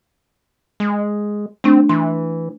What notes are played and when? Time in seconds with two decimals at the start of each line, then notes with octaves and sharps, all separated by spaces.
0.80 G#3
1.64 A3 C4 D4
1.89 E3 C6